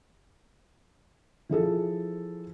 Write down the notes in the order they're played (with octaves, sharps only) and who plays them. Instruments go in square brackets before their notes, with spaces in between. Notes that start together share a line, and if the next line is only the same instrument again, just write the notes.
[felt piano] E3 F3 G#4 A4